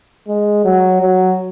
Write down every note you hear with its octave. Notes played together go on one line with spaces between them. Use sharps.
G#3
F#3
F#3